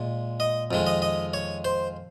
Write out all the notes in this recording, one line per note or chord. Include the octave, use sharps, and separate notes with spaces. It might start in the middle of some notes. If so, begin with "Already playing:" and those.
Already playing: A#2 G#3
D#5
F2 D#3 G#3
D#5
D#5
C#5
C5